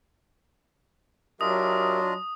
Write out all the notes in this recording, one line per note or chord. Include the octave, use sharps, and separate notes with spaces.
F#3 D4 F4 G4 A#4 D#5 E5 D#6